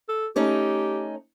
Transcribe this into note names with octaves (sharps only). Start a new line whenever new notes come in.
A4
A3 C#4 D#4 G4